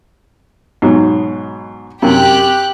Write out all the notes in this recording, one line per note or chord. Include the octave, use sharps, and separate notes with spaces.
G#2 B2 F#3
F#2 C3 G4 G5 F#6